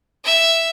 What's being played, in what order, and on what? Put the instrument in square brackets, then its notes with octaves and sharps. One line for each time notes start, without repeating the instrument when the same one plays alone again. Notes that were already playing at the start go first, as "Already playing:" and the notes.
[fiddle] E5